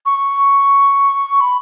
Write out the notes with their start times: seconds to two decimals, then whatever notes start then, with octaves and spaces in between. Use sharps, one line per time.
0.06 C#6
1.41 B5